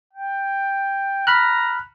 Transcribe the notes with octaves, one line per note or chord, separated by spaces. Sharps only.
G5
A#5 B5 F6 F#6